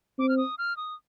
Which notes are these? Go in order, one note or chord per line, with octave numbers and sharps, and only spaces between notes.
C4 D6
F6
D#6
F6
D#6